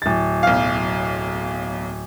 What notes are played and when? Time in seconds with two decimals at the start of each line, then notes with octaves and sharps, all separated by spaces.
0.02 D1 A6
0.43 B1 F5